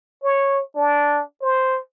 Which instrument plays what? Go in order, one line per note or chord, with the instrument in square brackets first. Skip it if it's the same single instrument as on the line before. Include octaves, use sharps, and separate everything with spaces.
[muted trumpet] C#5
D4
C5